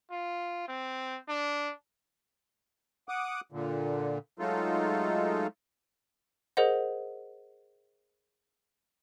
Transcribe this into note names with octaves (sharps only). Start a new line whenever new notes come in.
F4
C4
D4
F#5 D6 D#6
A#2 D3
F#3 G#3 A3 D#4 F4 A4
G#4 A#4 C5 D#5 F#5